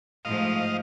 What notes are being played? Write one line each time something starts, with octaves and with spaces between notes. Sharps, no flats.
G#2 F3 A3 D#5 F5